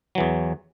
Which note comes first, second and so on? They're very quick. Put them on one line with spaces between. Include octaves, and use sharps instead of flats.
F#3 E3 E2